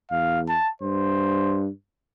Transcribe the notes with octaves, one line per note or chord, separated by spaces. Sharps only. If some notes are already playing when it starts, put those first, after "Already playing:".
E2 F5
A5
G2 C5